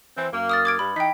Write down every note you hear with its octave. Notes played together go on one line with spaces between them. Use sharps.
E3 C4
F#2 A#3
D#6 F6 A6
D6 G#6 D7
G2 B5
E3 D#4 G5 B6